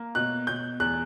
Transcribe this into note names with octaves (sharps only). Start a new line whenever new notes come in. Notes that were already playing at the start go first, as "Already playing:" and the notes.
Already playing: A#3
B2 F#6
B2 G6
E2 F#6